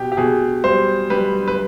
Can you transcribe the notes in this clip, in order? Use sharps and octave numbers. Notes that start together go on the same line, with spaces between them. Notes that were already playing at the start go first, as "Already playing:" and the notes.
Already playing: B2 G4
G4
B2 G#4
G3 C5
G3 B4
B4